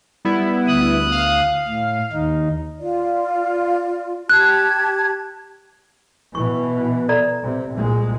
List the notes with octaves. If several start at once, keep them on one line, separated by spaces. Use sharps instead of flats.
G3 B3 E4
D2 D#6 F#6
F5
A2
D#2 D#4
F4 D5
G4 A5 F#6 G#6
B2 E3 C#6
A4 D5 A#5
C3
C2 A#2 G#3